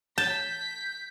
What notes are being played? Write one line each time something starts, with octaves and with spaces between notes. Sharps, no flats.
A5 G6 B6